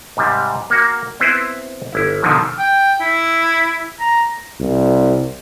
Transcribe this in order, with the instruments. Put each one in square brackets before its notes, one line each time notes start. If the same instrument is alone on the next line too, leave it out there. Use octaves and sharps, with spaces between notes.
[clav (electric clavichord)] G#2 C3 G3
A#3 F#4
B3 C4 E4 B4 C5
G1 E4
B2 D3 D#3 F3 F#3
[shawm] G5
E4
A#5
[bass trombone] C2